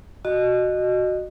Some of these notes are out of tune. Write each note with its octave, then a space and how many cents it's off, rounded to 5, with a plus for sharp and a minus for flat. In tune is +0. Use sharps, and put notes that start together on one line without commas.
F#4 +0 D#5 -20